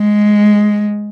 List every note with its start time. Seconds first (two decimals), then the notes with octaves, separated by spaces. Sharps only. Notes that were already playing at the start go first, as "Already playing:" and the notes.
Already playing: G#3